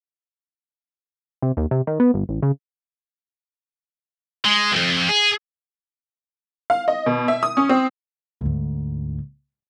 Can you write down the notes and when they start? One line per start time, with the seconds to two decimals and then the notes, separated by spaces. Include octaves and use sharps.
1.42 C3
1.57 D#2
1.71 C3
1.87 D#3
2.00 B3
2.14 G1
2.29 A1
2.42 C#3
4.45 G#3
4.72 B1 F2
5.09 G#4
6.70 F5
6.88 D#5
7.06 B2
7.28 E5
7.43 D#6
7.57 C#4
7.69 C4
8.41 D2 G#2